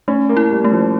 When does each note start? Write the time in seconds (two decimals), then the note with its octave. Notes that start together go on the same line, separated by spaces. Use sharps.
0.08 A3 C#4
0.29 A#3
0.37 E4
0.50 G3
0.64 A3
0.72 F3